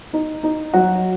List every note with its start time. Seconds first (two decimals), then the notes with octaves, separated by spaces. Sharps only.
0.13 D#4
0.43 D#4
0.74 F#3 F#4